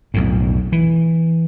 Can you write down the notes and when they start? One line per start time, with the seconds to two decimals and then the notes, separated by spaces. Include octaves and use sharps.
0.14 B1 F2 A2
0.72 E3